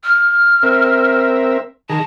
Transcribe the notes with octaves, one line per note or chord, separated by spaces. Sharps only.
F6
C4 A#4 E5
D#3 G#4 A5 A#5